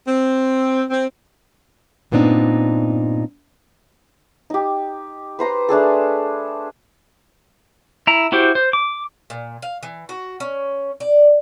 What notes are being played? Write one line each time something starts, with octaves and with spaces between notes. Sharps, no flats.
C4
C4
G2 A#2 B3 C4 D4 D#4
D#4 G4
B4 C5 A#5 C6
A3 D4 G#4 A4
E4 A#5
E4 F#4 G4 C5
C5
D6
A#2
F5
E3
F#4
C#4
D5